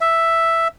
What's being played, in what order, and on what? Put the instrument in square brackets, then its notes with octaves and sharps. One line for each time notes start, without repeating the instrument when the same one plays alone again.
[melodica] E5